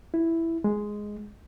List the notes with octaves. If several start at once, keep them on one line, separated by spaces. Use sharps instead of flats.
E4
G#3